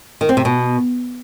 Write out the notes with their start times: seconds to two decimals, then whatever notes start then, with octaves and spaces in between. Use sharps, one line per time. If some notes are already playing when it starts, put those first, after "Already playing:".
0.21 D#3
0.29 C4
0.37 C3
0.45 B2